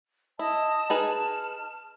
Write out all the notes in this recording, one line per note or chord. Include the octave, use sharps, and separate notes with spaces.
E4 D#5 A5 D#6
D#4 G#4 B4 F6